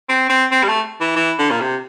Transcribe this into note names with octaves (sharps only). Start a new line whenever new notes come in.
C4
C4
C4
G3
A3
E3
E3
D3
A#2
C3